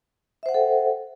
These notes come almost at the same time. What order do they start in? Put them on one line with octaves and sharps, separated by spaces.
E5 C5 F#5 G5 A4